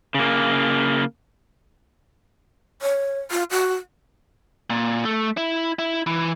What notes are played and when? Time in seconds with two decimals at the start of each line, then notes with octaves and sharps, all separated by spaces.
0.14 C#3 A#3
2.82 C#5
3.31 F4
3.51 F#4
4.70 A#2
5.05 A3
5.37 E4
5.79 E4
6.07 E3